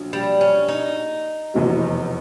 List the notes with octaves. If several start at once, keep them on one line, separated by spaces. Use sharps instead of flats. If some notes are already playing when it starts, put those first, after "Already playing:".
Already playing: A#1 F#3
G3
C#4
D#4
F1 E2 B2 F#3